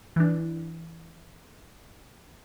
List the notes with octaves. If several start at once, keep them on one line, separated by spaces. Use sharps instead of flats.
E3 D4